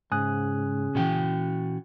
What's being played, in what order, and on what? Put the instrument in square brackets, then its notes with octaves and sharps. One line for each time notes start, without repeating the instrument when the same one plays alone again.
[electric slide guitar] G#2 [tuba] C#3 [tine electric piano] G#5 D#6 F#6
[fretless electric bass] A#2 E3 [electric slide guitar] C#4 F#4 G5